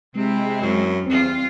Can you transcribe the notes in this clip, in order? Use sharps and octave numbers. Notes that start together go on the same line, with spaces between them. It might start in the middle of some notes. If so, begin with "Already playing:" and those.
C3 G#3 C4 E4
F#2
E2 G3 C4 F4